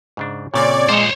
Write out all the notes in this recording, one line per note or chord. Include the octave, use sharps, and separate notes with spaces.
G#2 C#3 D4
A#2 C#3 A#3 C4 C#5 D5 G#6
A#2 F3 G#3 C5 C#5